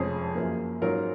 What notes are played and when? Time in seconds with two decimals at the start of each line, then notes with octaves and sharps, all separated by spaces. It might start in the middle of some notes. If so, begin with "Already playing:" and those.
Already playing: F1 F2 F3 G#3 C#4 G#4
0.35 F#2 F3 A#3
0.82 G#2 F#3 C#4 F4 A#4